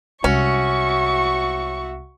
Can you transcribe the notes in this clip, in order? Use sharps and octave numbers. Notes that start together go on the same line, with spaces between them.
C2 G#3 C#4 F#4 E5 C#6